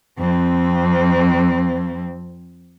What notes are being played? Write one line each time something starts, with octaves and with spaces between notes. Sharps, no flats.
F2 C4